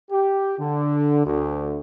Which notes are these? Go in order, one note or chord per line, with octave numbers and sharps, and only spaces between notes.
G4
D3
D2